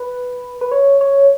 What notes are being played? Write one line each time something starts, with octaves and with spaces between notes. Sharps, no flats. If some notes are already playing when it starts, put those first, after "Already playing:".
Already playing: B4
B4
C#5
C#5